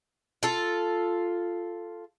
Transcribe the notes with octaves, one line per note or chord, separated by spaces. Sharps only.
F4 A4